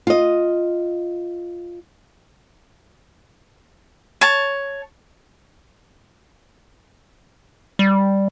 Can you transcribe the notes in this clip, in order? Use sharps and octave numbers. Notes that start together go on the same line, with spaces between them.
F4 D#5
C#5 A5
G3